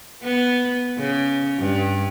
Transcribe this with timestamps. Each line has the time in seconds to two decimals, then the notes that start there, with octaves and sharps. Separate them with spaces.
0.24 B3
0.98 C#3
1.59 G2